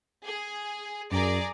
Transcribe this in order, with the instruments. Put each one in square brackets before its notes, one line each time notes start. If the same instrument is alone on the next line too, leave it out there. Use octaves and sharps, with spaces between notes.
[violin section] G#4
[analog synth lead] F#2 [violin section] G#4 D5 A#5